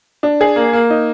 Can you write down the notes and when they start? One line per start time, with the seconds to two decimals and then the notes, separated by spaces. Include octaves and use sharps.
0.23 D4
0.41 G#4
0.56 A#3
0.73 A#3
0.90 D#4